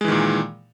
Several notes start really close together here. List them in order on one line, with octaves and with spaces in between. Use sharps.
G#3 E3 D#3 A#2